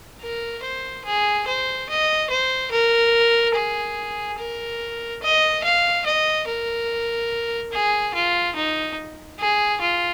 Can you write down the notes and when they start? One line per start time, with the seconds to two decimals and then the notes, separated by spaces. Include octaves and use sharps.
0.22 A#4
0.64 C5
1.05 G#4
1.48 C5
1.89 D#5
2.30 C5
2.72 A#4
3.56 G#4
4.39 A#4
5.23 D#5
5.64 F5
6.06 D#5
6.48 A#4
7.72 G#4
8.15 F4
8.56 D#4
9.39 G#4
9.81 F4